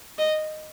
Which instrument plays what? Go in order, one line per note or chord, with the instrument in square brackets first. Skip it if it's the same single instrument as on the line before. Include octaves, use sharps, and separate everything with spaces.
[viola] D#5